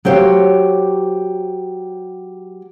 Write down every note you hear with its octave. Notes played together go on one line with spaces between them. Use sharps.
F#3 G4 C5 C#5 F5